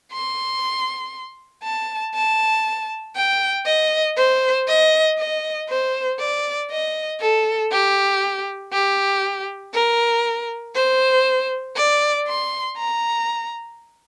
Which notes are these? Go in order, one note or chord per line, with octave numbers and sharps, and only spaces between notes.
C6
A5
A5
G5
D#5
C5
D#5
D#5
C5
D5
D#5
A4
G4
G4
A#4
C5
D5
C6
A#5